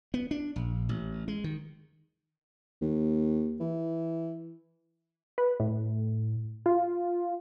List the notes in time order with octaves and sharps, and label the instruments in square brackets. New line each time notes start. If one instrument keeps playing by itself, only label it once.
[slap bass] B3
D4
A#1
A1
G#3
D#3
[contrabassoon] D#2
E3
[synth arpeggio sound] B4
A2
F4